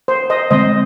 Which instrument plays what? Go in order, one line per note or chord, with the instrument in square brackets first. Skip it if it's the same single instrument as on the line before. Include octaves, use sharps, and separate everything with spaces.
[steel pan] C5
C5 D#5
[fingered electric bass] D3 G#3 C4 [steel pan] C5 D#5